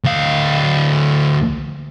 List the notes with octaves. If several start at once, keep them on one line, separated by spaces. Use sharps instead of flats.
D2 F5